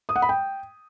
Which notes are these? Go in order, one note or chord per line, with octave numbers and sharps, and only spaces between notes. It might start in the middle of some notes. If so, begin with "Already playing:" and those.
D#6
F#5
B5
G5